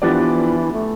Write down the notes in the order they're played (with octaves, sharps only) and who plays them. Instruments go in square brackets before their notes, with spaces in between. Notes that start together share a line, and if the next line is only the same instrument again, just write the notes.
[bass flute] E3 [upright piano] F3 B3 D4 G4 D5
[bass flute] A3